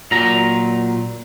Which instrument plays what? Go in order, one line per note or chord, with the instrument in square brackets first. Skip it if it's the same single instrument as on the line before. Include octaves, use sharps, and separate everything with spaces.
[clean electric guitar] A#2 F#3 A#5